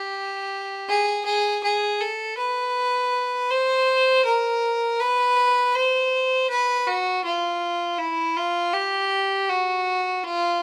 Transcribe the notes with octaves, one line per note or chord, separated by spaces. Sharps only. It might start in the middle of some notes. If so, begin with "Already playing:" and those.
Already playing: G4
G#4
G#4
G#4
A4
B4
C5
A#4
B4
C5
B4
F#4
F4
E4
F4
G4
F#4
F4